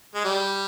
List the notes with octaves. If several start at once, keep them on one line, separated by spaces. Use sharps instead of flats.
G#3
G3